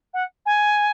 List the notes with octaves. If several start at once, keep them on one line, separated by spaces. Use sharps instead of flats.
F#5
G#5